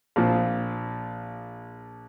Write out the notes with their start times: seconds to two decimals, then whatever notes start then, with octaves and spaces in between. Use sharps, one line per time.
0.16 A#1 A#2 F3 C4